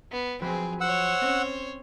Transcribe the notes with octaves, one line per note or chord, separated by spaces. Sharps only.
B3
F3 F#3 C4 G#4 B4
C5 C#5 F#5 E6
C4 C#4